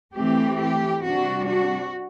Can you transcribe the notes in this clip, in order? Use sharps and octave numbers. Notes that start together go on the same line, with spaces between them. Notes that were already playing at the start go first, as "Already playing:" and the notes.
E3 A3 C4 G4
G4
C3 G3 D4 F#4
F#4